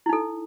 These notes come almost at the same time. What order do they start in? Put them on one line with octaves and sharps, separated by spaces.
E4 D#4 A4